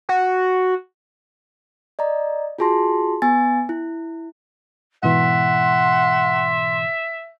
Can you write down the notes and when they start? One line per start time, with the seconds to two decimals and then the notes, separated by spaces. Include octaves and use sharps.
0.09 F#4
1.99 D5 D#5 A#5
2.58 F4 F#4 G#4 A5 C6 A#6
3.22 B3 G#5 A6
3.69 E4
5.03 G#2 B2 E3 E5 F#5 C6